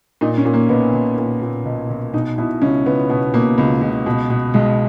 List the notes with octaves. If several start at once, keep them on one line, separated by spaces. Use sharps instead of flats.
A#2 D#4
C#4
A#2
A#3
B1 B3
B1
A#2
A#2
B1
B1
B2 D#4
B2 E4
C#2 C#4
C#2 B3
B2 B3
B2 A#3
C#2
C#2
B2
B2
B1 G#3